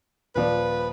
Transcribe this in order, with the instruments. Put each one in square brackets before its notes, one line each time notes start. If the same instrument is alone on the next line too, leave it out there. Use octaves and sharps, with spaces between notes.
[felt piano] D#1 F3 D5 [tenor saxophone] B4